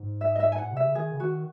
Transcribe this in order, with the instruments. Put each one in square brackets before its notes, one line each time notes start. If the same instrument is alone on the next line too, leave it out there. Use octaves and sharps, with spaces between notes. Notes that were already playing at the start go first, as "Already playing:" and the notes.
Already playing: [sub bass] G#2
[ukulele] E5
D#5
E5
G#5
[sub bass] A2 [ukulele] F#5
[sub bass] C3
[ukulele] E5
[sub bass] C#3
[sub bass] D#3 [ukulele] G#4
[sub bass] C#3
[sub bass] D#3 [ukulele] F#4